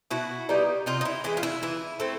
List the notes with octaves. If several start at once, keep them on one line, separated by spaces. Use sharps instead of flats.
B2 E4 F#4
G3 B3 D#4
C3 D#4 F4
D#4
E4
E3 G#3 E4
F4
E4
E3 E4
A3 C4